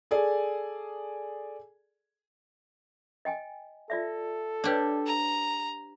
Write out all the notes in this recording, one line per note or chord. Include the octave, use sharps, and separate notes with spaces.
G#4 A4 D5 G#5
D#5 G5 G#5
F4 A4 D5 E5
D4 G4 B4 C#5 D5
A#5